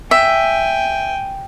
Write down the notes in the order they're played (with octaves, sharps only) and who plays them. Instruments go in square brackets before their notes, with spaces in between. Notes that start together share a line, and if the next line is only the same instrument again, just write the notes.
[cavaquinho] E5 [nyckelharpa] G5 G#5